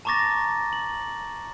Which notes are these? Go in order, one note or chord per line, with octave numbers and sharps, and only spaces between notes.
A5 A#5 C#6 D6 A6 A#6
F#7